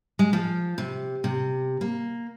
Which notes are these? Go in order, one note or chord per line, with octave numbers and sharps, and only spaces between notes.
G#3
F3
C3
C3
A#3